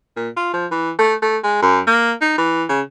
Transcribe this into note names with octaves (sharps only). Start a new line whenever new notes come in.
A#2
F4
F3
E3
A3
A3
G#3
F#2
A#3
D#4
E3
C#3